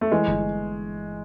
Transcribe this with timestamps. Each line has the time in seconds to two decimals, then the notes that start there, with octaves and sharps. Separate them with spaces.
0.01 A3
0.12 E3 G#3
0.28 G1